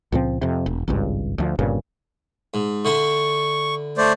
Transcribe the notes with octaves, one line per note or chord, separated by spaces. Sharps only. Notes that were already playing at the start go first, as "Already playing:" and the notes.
C#2 A#2 F3 C4
F2 C3
E1
G#1 C#2 G2
D2 F3
G1 G2 A#2 C#3
G#2
D3 E4 C6 C#6
A3 C5 D5